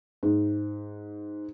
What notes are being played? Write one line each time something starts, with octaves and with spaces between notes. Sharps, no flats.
G#2